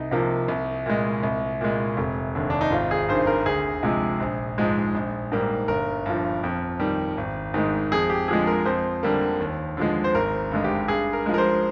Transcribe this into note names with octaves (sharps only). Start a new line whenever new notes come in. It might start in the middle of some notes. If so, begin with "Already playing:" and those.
Already playing: C2 D#4
C3 F3 A#3
C2
A#2 G#3
C2
A#2 G#3
F1
D#2 D3
D4
D#4
G#1 F4
G#4
G2 D#3 C5
A#4
D2 G#4
C3 F3 G#3
A#1
G#2 F3 G#3
A#1
G#2 G3 A#3
G1 A#4
G2 F3
F2
D#3 G3
G#1
G#2 D#3 G#3
F2 G#4
G4
D3 F3 G#3 G#4
A#4
F2 C5
D3 G3 A#3
D#2
D3 F3 G#3
C5
G#1 A#4
G2 D3 G#3
G4
G2 G#4
A#4
F3 G#3
A#4
C5